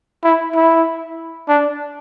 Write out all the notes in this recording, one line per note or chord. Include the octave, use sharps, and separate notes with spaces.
E4
E4
D4